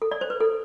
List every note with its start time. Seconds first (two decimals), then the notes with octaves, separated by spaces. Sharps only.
0.02 A4
0.11 D5
0.21 C5
0.30 B4
0.40 A4